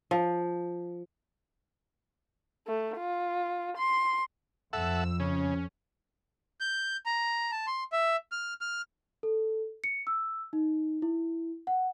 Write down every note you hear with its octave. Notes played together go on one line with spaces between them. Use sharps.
F3
A3
F4
C6
F2 A4 E5 F#5 E6
C#3 C#4
G6
A#5
A5
C6
E5
F6
F6
A4
C#7
E6
D#4
E4
F#5